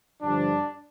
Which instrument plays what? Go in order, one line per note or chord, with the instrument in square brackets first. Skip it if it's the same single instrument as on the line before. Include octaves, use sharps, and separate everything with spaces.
[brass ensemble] G2 D3 F3 D4